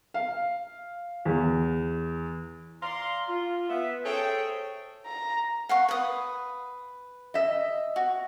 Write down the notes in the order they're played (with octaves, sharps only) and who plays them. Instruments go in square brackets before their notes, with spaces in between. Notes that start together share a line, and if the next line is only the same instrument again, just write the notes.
[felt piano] F5
E2
[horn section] D5 F5 A#5 C6
F4
B3 E5
G#4 A4 C5 C#5 E5 G5
[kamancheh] A#5
[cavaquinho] F5 F#5 C#6
B4 D#6
[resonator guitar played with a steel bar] D#5 E5
[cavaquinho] F#4